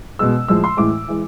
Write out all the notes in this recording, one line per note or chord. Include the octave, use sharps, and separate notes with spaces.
B2 G#3 E6
A2 F3 G#3 E6
C6
A2 E3 G#3 D6
E3 G#3